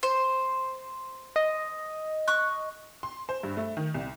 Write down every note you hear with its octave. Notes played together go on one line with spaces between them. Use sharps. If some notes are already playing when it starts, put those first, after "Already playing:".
C5
D#5
C#6 F#6
C6
C5
G2
A3
D#3
C2